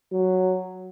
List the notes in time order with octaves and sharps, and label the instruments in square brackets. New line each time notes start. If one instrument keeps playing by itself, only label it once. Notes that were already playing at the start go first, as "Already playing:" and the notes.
[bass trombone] F#3